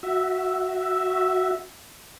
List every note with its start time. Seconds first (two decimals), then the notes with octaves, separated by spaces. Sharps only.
0.03 F#4 E5